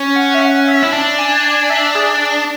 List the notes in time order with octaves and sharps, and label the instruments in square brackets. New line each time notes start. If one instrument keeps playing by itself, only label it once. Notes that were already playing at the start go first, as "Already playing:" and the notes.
Already playing: [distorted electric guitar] C#4
[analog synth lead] F#5
E5
F#5
E5
[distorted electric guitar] E4
D4
[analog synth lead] G#5
G#5
E5
G#4